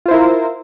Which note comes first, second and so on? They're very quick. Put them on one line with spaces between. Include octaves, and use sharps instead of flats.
F4 C5 E4 A#4